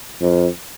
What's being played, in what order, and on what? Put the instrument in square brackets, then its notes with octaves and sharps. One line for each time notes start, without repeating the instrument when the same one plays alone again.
[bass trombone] F2